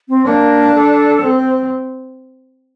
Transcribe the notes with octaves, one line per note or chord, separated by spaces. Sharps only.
C4
A#3 D4
A4
C4
C5